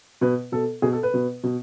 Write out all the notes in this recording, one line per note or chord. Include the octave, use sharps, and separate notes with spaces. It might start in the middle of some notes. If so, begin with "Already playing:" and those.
B2 B4
B2 A4
B2 G#4
A4
B4
B2
B2